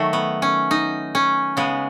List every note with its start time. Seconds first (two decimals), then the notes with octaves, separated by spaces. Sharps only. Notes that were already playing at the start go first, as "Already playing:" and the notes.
Already playing: D#3 F#3 A3
0.13 B3
0.42 C#4
0.71 D#4
1.15 C#4
1.57 C#3 G#3 B3